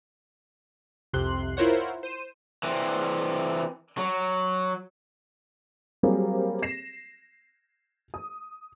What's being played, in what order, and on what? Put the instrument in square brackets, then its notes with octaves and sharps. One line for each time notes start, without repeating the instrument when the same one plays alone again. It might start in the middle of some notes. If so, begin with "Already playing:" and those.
[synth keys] C2 F2 C3 C6 F#6
E4 F4 A#4 C5 C#5 F#5
C5 D#7 E7
[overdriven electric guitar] E3 C4
F#3
[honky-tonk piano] F#3 G3 A#3 C4 G4 G#4
A#6 C7 E7
D#6